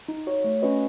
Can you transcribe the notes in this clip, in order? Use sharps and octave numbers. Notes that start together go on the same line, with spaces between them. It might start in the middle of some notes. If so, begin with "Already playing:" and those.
D#4
F#4 C#5
A3
C#4 F#4 B4 D#5